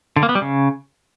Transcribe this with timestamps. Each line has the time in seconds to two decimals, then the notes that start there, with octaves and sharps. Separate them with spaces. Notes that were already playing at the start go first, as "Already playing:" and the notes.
0.16 D3
0.23 A#3
0.29 B3
0.35 G3
0.41 C#3